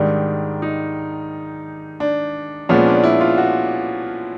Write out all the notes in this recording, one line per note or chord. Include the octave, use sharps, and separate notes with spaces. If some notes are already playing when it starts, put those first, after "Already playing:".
Already playing: G#2 D#3 G3 D4
D#4
D4
A#2 F3 G#3 B3 C#4
D4
E4
F4
F#4